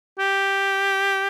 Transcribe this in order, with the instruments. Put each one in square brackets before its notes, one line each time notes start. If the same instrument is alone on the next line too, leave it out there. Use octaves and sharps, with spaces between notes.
[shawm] G4